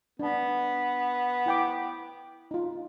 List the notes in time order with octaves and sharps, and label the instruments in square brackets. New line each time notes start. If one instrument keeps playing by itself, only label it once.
[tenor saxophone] B3 [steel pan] D4 A5
[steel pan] E4 G5 D6
D#4 F4